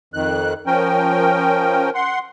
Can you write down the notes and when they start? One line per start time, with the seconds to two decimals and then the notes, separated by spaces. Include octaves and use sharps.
0.14 F2 D#3 F#6
0.66 F3 C#4 A#4 G5
1.95 F#5 C6